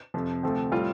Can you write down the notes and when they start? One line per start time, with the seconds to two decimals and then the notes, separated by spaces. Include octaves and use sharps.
0.14 F2 C3 F3
0.43 D2 C3 F3 A3 C4
0.72 A2 G3 C4 F4